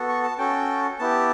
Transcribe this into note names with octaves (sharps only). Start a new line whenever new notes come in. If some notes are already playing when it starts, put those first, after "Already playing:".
Already playing: B3 F#4 A4
C#6
A5
C#4 F#4 A4 G5
B3 E4 G4 A5